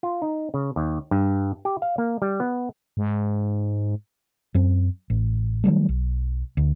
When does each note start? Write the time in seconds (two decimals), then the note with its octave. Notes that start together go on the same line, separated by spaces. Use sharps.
0.03 F4
0.22 D#4
0.54 C#3
0.76 D#2
1.11 G2
1.65 G4
1.82 F5
1.98 A#3
2.22 G3
2.40 B3
2.97 G#2
4.54 F#2 C4
5.10 A1
5.64 D#3 F#3 G3 A3
5.89 B1
6.57 D2